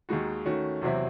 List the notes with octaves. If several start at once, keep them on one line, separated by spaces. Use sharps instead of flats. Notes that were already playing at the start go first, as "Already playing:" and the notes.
D#2 D#3 G#3 D#4 F#4
D#3 A3 C#4 F#4
E2 C3 F#3 C4 E4